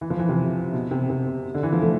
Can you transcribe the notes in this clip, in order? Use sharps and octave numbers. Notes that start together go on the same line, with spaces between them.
E3
F3
E3
C3
B2
C3
C3
D3
E3
F3
A3